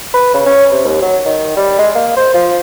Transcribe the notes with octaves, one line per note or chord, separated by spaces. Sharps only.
B4
C#3
C#4
C3
D#2
F#3
D#3
G3
G#3
A#3
C5
F3